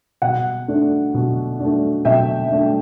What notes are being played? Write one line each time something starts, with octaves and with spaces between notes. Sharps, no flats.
B2 F#5
A3 D4
B2
A3 D4
B2 E5 G5
A3 D4